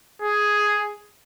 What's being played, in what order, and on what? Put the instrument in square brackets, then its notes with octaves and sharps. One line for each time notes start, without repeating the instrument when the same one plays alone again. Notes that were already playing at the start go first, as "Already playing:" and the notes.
[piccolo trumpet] G#4